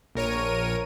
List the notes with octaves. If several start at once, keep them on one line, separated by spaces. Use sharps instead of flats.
A#1 A#4 C#5 D#7